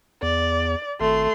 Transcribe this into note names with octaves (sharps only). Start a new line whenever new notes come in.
E2 D5
G#1 A3 C6